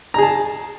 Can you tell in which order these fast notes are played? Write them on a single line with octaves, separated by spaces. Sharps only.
A#5 G#4 A5